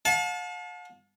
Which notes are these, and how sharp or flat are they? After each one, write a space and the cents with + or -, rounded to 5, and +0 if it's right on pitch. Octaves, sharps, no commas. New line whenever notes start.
F5 +45 A5 -20